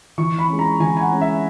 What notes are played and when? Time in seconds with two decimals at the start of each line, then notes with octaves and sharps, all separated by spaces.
0.18 E3 C#6
0.39 B5
0.48 G#3 C#4
0.59 A#5
0.80 E3 G#5
0.97 G#5
1.01 F#5
1.12 G#3 C#4
1.21 E5